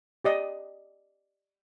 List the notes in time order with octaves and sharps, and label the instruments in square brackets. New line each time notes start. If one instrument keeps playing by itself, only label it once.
[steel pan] G4 D5 D#5